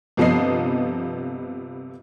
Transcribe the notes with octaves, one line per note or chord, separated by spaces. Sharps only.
G1 C3 F3 B3 D#5 C7